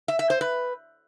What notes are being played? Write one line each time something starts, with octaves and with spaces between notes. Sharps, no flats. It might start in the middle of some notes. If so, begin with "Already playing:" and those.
E5
E5
C5
B4